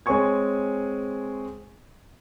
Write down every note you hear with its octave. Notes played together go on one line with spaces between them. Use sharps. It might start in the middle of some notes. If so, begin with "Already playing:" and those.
G#3 C4 C#5 G#5 C#6 G#6